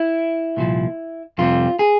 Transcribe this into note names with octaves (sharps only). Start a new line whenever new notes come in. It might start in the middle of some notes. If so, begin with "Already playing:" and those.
Already playing: E4
C2 A#2 F3
F2 C3 G3 C4 F4
G#4